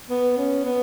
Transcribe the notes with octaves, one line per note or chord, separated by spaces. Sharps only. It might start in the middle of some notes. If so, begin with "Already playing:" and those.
B3
C#4
B3